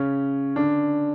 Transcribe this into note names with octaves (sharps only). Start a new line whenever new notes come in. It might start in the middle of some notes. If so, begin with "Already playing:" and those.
Already playing: C#3 C#4
D3 D4